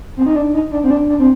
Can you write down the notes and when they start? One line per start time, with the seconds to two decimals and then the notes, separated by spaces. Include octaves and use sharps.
0.17 C4
0.26 D#4
0.36 D4
0.53 D#4
0.71 D4
0.84 C4
0.91 D4
1.09 D4
1.19 C4